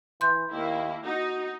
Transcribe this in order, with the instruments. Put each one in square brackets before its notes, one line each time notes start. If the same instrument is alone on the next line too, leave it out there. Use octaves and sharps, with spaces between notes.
[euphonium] E3 [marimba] C6 G6
[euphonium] D#2 [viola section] A#3 E4
[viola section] D#4 [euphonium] F#4